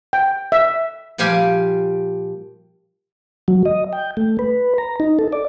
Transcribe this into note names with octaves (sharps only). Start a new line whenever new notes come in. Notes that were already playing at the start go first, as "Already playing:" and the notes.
G5
E5
A#2 F3 G3 G4 F5 G#5
F#3
D#5
G5
A3
B4
A#5
D#4
A4
D5